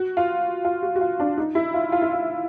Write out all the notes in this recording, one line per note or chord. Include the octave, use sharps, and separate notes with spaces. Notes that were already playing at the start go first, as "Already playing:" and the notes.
Already playing: F#4
F4
F4
F#4
F#4
F4
D4
D#4
E4
F4
F4
E4
F4